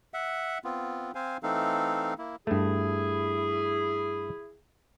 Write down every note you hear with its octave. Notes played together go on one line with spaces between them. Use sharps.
E5 F#5
B3 C4 F4
C4 C5 F5 G#5
E3 A3 C4 D#4 A4 F5
A#3 E4
G2 A3 E4 G#4